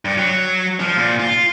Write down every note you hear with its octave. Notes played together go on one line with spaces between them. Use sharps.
G2
F#3
F3
A#2
F4